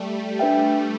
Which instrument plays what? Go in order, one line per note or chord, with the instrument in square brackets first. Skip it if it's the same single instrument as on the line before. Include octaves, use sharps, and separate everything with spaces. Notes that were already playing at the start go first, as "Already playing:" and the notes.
Already playing: [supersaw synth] G3 A3
[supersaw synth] G3 [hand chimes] D4 B4 E5 G5